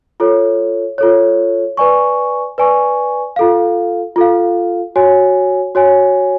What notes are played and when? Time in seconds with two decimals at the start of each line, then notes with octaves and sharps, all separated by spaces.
0.20 F4 A4 C#5
0.98 F4 A4 C#5
1.77 B4 D5 G#5 C#6
2.58 B4 D5 G#5 C#6
3.36 F4 A4 F5
4.16 F4 A4 F5
4.96 F#4 C#5 G#5
5.75 F#4 C#5 G#5